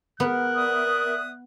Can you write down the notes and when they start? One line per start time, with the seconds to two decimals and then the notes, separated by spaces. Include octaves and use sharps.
0.20 B3 A#4 F#6
0.56 D5 E5 D#6